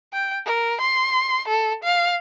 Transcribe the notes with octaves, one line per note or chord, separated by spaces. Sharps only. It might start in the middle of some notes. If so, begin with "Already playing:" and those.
G5
A#4
C6
A4
F5